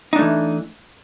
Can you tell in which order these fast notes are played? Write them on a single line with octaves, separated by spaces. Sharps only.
D#4 D4 A3 E3